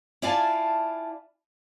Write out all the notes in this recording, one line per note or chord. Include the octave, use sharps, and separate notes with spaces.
E4 F4 D5 F5 G#5 A5